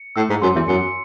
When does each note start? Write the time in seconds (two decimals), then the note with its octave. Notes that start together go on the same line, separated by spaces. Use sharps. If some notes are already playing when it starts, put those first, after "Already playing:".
Already playing: C#7
0.16 A2 E6
0.30 G#2
0.42 F#2 C6
0.55 E2
0.68 F#2 C#7